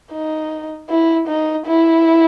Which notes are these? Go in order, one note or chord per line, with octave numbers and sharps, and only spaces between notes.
D#4
E4
D#4
E4